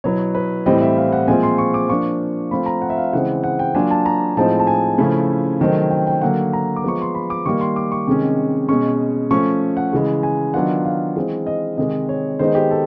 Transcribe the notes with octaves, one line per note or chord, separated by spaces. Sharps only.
B2 F#3 B3 E4 C#5
B4
A2 E3 G3 C4 D#5
E5
F5
F#5
A#2 F3 G#3 C4 F4 G#5
C6
C#6
D6
F3 A#3 D4 C#6
F3 A3 C4 F4 B5
A#5
F#5
E5
F5
C#3 E3 G#3 C4 F#5
F#5
G5
F#3 A#3 D4 F4 G#5
A5
A#5
A2 F3 G#3 C4 D#4 A5
A5
G#5
C#3 F3 A3 C#4 E4
C3 D#3 F#3 A3 C4
G5
G5
D3 F#3 A#3 F#5
A#5
D6
F3 G#3 B3 C#6
C6
B5
D6
D#3 G3 A#3 C#6
C6
D6
C#6
C3 D#3 G#3 C#4
B2 G#3 C#4 C#6
F3 A3 C#4 C#6
F#5
C#3 E3 G#3
G#5
D#3 F#3 B3 D4 F4 F#5
F5
E3 G#3 C4
D#5
C3 D#3 G#3 D#5
C#5
D#3 G#3 B3 D#4 C5
G4
A4